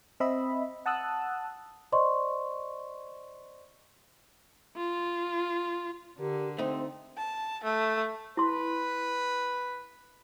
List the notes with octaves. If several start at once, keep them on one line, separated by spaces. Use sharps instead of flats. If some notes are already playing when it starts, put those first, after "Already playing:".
C4 D#5 E5 B5
F#5 A5 D#6 E6 F#6
C5 D5 D#5 C6 C#6
F4
D3 G4 A#4
A3 C4 D#4 C5
A5
A3
E4 B4 C6